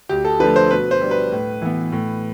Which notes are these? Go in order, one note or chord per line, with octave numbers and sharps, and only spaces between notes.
D2 G4
A4
D3 F3 A3 B4
C5
B2 B4
C5
G3 D4
B4
A2
E3 B3
A2